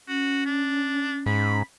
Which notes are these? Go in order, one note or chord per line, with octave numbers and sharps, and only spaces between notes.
C#4 F#4
D4
G#2 B5